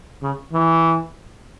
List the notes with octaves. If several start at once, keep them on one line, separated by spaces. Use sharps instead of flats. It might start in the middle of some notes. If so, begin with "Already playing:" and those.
C#3
E3